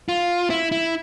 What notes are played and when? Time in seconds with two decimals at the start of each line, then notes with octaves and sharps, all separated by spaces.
0.09 F4
0.50 E4
0.72 E4